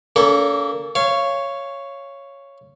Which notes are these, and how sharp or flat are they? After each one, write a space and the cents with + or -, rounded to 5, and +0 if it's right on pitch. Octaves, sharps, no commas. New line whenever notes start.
A#3 +0 C#4 +45 A4 +0
C#5 +0 F5 -25